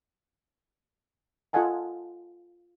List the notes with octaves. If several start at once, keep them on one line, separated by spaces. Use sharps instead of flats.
F4 A4 D#5 F#5 G#5 A5